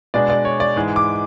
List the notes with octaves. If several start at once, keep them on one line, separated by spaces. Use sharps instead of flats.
B2 G#3 D4 D5
D5
C#5
D5
G#2 E3 G#3
D6